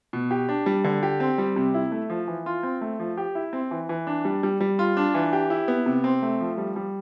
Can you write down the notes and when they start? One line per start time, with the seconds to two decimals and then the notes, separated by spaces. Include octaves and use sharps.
0.13 B2
0.31 G4
0.49 D4
0.66 G3
0.84 D3
1.03 G4
1.20 C4
1.38 G3
1.56 C3
1.74 E4
1.92 A3
2.10 F3
2.28 E3
2.46 F4
2.63 C4
2.81 A3
3.00 F3
3.17 G4
3.35 E4
3.53 C4
3.71 E3
3.89 E3
4.07 D4
4.25 G3
4.43 G3
4.61 G3
4.79 F4
4.97 D4
5.14 E3
5.33 G4
5.50 E4
5.68 B3
5.86 C3
6.04 C4
6.22 A3
6.41 F3
6.58 G3
6.76 G3